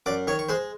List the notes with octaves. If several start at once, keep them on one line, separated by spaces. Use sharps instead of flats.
F#2 D5 D6
D#3 C#5 C#6
C#6
G#3 C5 C6